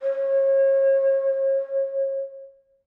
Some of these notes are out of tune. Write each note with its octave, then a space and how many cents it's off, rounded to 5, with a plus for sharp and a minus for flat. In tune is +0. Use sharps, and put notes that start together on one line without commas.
C#5 -35